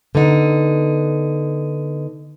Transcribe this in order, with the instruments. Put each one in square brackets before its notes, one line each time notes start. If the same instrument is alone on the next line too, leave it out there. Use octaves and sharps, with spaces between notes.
[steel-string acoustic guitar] D3 B3 D#4